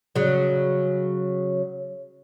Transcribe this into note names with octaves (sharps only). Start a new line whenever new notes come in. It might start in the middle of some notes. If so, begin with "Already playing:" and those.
C#3 F#3